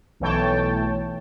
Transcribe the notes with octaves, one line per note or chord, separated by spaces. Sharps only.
B1 E3 A3 C#5 G5 A5